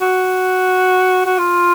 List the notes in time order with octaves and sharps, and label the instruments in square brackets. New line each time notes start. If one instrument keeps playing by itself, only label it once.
[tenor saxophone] F#4
F#4
F4